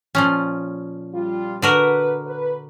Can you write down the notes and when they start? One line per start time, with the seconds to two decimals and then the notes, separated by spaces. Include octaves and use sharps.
0.15 A#2 F3 C#4
1.12 G3 F4
1.62 D3 F#4 A#4 B4
2.25 B4